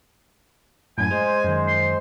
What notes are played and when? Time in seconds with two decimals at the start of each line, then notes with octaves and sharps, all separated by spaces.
0.98 F#2 A2 G#5
1.11 G#3 G#4 C5
1.45 F#2 D#3
1.68 C6